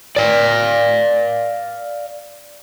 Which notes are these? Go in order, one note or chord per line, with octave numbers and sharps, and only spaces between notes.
D5 F5